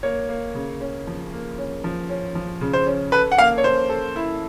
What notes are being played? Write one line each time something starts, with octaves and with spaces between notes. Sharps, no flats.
A#3 C#5
A#3
C#3
C#4
F3
A#3
C#4
F3
C#4
F3
C#3
C5
C#4
A4 B4
F#5
A#3 F5
C#5
C#4 C5
A4
E4